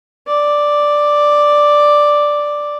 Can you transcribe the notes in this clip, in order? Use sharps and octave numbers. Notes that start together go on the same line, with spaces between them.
D5